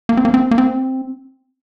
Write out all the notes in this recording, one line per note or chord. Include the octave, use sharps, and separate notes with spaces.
A#3
C4
A#3
C4
A#3
C4